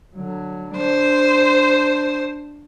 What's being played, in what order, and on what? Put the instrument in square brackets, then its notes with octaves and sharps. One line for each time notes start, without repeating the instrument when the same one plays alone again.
[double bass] D3 F#3
[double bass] D4 [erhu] C5